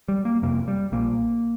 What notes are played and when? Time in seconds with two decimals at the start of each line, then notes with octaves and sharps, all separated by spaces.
0.08 G3
0.25 A#3
0.42 F1 F2 C3 A#3
0.68 G3
0.92 A#1 A#2 A#3